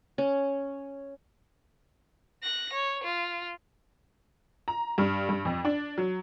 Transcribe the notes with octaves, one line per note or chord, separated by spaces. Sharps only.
C#4
F#6 A#6
C#5
F4
A#5
G2
G2
F2
D4
F#3